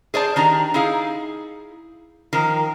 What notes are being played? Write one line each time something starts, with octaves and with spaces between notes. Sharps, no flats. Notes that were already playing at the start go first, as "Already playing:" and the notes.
G#4 C5 D5 A5
D#3 D4 G4 A#5
D#4 E4 G#4 F5
D#3 F3 A#4